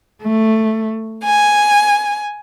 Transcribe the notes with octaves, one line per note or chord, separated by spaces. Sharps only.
A3
G#5